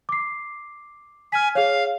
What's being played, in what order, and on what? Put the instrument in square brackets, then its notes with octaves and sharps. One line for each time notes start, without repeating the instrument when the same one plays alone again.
[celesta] D6 C7
[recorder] G#5 [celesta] F6 B6
[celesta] G#4 C#5 [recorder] F5